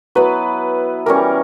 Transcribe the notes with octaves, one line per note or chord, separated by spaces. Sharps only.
F#3 B3 E4 B4
E3 G3 C#4 A#4